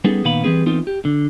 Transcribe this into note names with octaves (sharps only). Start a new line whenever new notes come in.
G3 B3 C#4 D#4 G#4 A4
A#2 D#3 B3 F5 B5
E3 G3 A#3 C4 G#4 B4
E3 B3 C4 D#4 F4 A4
G4
D3